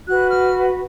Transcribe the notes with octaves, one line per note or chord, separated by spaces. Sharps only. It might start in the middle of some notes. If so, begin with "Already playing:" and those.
F#4 B4 F#6
F6